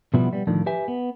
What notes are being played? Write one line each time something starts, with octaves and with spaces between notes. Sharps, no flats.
B2 F3 G3 B3 E4 F#4
G3 B3
A2 D3 D#3 F3
G4 B4 E5 G#5
B3